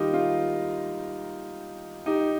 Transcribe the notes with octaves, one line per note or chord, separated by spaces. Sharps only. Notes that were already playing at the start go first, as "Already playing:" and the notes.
Already playing: D#2 D#3 G3 D#4 F4 G4 A#4
F4
D#4 G4